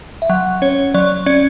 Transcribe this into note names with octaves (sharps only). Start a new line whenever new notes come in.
E5
F#3 F#5
C#4 C#5
F#3 D5
C#4 D5